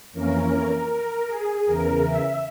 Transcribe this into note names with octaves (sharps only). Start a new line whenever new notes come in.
F2 E3 A#3 C#4 A#4
A#4
G#4
E2 C#3 E3 A#4
E5